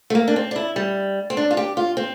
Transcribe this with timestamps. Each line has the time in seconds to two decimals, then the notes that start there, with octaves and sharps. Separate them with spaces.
0.10 A3
0.15 A#3
0.28 D4
0.36 C4
0.51 D4
0.56 E4
0.76 G3
1.30 C4
1.37 D4
1.51 F4
1.57 G4
1.77 F4
1.97 C4